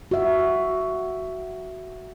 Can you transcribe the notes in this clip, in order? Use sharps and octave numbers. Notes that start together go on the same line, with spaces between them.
F#4 E5